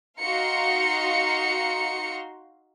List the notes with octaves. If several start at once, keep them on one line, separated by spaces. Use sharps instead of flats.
D#4 F#4 F5 A#5 C6 C#7